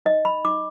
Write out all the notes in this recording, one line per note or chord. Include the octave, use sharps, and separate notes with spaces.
D#4 D#5
B5
D#4 D6